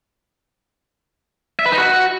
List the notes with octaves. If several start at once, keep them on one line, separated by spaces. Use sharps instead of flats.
E5
B4
D#4
F#4